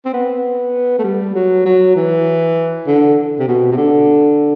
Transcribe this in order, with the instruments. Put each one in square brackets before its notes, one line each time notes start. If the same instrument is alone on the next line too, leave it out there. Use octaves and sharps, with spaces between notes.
[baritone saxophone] C4
B3
A3
G3
F#3
F#3
E3
D3
C3
B2
C3
D3